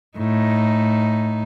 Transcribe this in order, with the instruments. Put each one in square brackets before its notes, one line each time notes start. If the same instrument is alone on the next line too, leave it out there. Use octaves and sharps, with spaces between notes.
[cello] A2 D#4